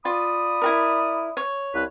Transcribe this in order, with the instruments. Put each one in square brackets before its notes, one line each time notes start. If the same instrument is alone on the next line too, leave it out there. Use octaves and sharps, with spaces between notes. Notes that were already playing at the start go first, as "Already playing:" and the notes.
[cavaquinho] F4 [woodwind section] D5 B5 D#6
[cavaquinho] E4 F#4 A#4
C#5
[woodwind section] C2 B4